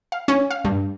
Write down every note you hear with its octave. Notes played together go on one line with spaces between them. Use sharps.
F5
C#4
F5
G2